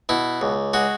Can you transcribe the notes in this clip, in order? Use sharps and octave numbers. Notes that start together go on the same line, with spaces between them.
B2 E4
C#2
G#3 F#4